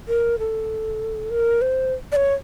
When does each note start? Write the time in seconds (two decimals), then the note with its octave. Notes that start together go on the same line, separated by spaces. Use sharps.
0.08 A#4
0.39 A4
1.30 A#4
1.61 C5
2.12 D5
2.16 C#5